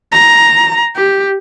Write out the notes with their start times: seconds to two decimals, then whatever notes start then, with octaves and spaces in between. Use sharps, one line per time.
0.12 A#5
0.96 G4